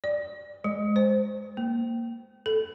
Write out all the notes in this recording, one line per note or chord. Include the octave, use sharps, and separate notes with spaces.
D5
G#3
C5
A#3
A4